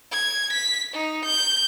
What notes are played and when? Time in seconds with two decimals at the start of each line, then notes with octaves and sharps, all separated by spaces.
0.12 G#6
0.52 B6
0.94 D#4
1.25 G6